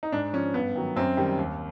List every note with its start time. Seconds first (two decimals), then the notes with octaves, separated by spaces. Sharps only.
0.03 D#4
0.12 G#2 D4
0.33 F3 C#4
0.54 G2 B3
0.75 D#3 F#3
0.96 F#2 C4
1.17 D#3 G3
1.38 D#2